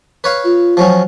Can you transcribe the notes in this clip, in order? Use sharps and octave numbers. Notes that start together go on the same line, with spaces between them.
B4 C#5 F5
F4
F3 F#3 C#4